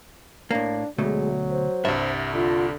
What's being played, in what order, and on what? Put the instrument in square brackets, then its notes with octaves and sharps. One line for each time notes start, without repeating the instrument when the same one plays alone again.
[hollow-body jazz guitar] A2 A#3 [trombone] D4
[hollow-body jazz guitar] D2 B2 A3 [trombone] F#3 [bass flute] G#3
[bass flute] C5
[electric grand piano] C2 G2 [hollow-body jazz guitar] E5
[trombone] D3 [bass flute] F4